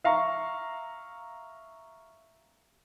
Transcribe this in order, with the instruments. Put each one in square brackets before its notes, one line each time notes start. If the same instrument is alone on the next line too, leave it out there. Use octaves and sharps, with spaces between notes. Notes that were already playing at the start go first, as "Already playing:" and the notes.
[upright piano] E5 F5 A#5 C#6